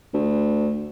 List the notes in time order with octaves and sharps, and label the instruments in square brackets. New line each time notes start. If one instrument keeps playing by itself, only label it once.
[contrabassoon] D2